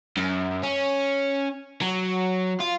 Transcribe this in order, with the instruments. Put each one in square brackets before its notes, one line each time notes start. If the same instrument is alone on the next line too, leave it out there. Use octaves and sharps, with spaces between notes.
[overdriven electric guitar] F#2
C#4
F#3
F4